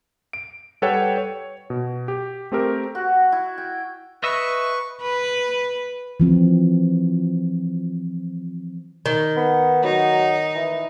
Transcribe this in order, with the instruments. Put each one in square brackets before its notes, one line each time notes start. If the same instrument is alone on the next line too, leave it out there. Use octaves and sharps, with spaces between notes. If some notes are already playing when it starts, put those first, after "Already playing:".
[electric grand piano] D7
G3 A4 B4 C#5 F#5 G5
C#5
B2
G4
A3 C4 G4 A#4
[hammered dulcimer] F#4
E4
G5
[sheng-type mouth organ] B4 C#6 [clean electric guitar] D#5 E5
[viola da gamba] B4
[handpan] E3 F3 C4
[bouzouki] D#3
[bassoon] B3
[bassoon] F#3 [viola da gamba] D#4
[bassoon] E3